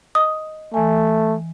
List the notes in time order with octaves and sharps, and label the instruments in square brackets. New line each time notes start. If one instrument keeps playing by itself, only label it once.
[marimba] D#5 [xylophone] D#6
[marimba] E3 G#5 [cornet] A3